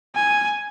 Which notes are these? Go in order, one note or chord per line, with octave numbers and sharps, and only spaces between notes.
G#5